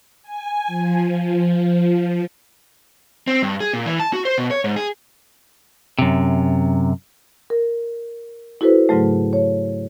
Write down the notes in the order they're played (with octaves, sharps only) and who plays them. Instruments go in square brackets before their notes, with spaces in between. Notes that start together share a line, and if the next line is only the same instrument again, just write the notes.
[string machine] G#5
F3
[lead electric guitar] C4
G2
G#4
A#2
E3
A5
F#4
C5
B2
C#5
G#2
G#4
[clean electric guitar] F#2 C3
[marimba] A#4
E4 F#4 A4 B4 C5
G#2 C#3 F#3 A3
C#5